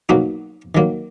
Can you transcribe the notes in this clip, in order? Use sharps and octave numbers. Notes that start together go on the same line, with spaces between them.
B2 F#3 A#3 D#4 F#4
D#3 F#3 A#3